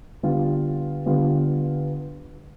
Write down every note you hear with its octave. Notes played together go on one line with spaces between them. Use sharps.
D3 G3 B3 F4
D3 G3 B3 F4